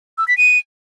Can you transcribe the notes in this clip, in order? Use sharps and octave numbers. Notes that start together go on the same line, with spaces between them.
E6
B6
D#7